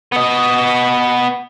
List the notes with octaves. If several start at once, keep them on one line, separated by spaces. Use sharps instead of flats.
B3 D#5